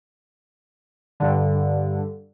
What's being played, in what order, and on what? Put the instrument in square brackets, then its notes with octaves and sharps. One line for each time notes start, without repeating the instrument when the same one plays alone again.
[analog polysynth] G2 D3